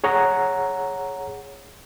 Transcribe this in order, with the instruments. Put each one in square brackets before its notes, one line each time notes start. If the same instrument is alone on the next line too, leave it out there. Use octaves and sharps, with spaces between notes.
[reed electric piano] G#4 C#5 F#5 A#5